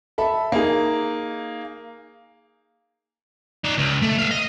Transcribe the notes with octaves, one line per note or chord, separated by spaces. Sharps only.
A4 E5 B5
A#3 D#4 G#4
D#4 D5
C#2
A3
E5 F5
D#5